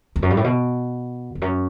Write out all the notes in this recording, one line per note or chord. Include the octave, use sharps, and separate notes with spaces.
E2
F#2
G2
A2
B2
E2
F#2